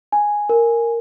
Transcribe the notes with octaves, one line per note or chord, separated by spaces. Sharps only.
G#5
A#4